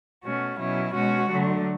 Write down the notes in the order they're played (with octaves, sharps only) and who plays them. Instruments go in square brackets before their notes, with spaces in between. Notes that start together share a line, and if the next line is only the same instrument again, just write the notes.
[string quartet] B2 A3 C#4 F#4
B2 F#3 C#4 E4
B2 G#3 C#4 F#4
D3 F#3 A3